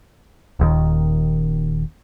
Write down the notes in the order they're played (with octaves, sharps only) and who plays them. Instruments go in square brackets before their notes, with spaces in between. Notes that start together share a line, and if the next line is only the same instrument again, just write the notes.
[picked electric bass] D#1 D#2 D#3